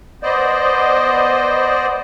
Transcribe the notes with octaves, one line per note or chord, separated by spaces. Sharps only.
B3 C5 D5 D#5